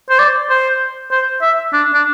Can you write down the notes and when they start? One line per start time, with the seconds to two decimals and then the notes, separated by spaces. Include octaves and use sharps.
0.10 C5
0.19 D5
0.50 C5
1.11 C5
1.42 E5
1.73 D4
1.94 D4